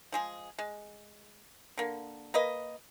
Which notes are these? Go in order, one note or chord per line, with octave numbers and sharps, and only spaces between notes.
F3 G#3 G#4
G#3
D3 A#3
A#3 B4 D#5